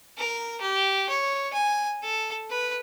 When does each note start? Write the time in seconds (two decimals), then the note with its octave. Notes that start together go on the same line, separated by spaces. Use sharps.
0.18 A#4
0.61 G4
1.10 C#5
1.53 G#5
2.03 A4
2.50 B4